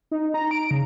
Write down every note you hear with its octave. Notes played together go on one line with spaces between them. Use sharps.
D#4
A#5
D7
C#3